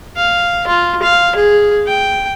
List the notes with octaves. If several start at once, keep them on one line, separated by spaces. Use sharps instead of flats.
F5
F4
F5
G#4
G5